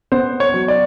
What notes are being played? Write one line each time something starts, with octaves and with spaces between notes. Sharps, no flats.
B3 C5
C#5
F#3
D5